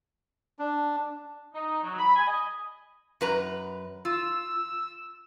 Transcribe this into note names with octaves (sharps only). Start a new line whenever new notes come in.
D4
D#4
F#3
B5
G#5
D#5
F#2 B4 A#5
F4 E6